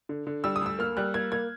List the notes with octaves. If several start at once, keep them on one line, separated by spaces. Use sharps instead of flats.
D3
D3
G3 E6
D#6
D2 E6
A#3 F6
G3 F#6
A#3 G#6
A#3 G#6